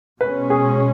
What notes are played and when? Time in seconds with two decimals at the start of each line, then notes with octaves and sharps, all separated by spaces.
0.21 B2 G#3 C#4 B4
0.50 G#4